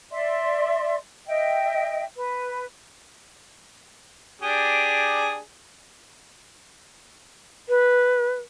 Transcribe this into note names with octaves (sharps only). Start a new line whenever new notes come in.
D5 E5 C6
D#5 E5 G5
B4
D4 G4 G#4
B4